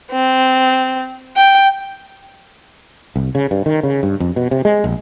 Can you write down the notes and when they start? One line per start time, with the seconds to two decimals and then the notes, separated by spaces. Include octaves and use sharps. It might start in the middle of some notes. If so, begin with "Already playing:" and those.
0.12 C4
1.37 G5
3.16 C2
3.35 C#3
3.51 G2
3.66 D#3
3.83 C#3
4.03 G2
4.20 F2
4.36 B2
4.51 C3
4.65 G#3
4.84 A#1